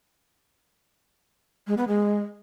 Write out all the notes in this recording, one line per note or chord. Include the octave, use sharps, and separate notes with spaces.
G#3
B3
G#3